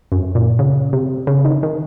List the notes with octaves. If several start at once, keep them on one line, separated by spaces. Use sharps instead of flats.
F#2
A#2
C#3
C3
C#3
D#3
D#3